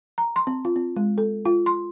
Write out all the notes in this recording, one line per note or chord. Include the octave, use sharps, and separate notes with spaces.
A#5
C6
C4
F4
C4
G#3
A4
F4
C6